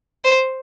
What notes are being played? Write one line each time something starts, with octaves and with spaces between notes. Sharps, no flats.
C5